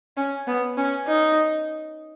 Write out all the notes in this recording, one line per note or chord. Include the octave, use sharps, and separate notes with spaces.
C#4
B3
C#4
D#4